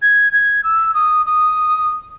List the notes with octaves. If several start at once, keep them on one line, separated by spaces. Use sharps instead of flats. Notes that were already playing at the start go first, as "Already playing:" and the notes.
G#6
G#6
E6
D#6
D#6